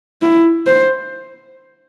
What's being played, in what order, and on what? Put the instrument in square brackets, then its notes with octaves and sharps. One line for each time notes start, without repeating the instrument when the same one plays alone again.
[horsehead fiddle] E4
C5